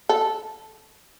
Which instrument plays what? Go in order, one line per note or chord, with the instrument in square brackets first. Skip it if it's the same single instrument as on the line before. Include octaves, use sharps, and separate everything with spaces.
[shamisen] A4